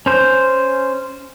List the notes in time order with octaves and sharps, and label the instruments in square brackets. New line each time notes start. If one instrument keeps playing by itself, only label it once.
[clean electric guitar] C#4 C5